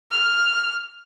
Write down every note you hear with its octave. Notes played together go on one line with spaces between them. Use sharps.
F6